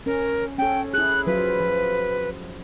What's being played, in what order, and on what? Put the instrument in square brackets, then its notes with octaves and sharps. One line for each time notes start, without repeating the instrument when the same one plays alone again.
[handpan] C#4 [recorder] A#4
[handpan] C#4 A4 [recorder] G5
[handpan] E4 G#4 [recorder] F#6
[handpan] F3 F#3 F4 [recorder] B4
[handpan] F3